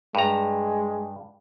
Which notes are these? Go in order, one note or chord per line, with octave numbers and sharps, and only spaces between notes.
G2 G#3 A#5